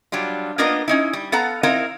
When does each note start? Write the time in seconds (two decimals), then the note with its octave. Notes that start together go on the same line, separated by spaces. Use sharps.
0.12 F#3 G3 D4 F4
0.58 A#3 B3 D4 F4 A#4 D#5
0.88 C#4 D#4 E4
1.13 G3
1.32 B3 A4 F5 F#5 A#5
1.63 C4 D#4 E4 A#4 F5